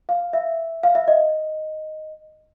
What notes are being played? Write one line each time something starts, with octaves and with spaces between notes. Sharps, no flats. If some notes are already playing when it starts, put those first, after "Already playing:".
F5
E5
F5
E5
D#5